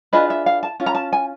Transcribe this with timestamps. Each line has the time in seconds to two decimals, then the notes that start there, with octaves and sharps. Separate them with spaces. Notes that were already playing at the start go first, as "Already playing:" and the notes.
0.13 D4 F4 G#4 B4 D#5
0.30 E5
0.46 F5
0.63 A5
0.80 C#4 F4
0.86 A#5
0.95 A5
1.13 G#5